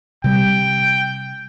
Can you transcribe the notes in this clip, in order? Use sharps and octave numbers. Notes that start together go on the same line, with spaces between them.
C3 G3 G5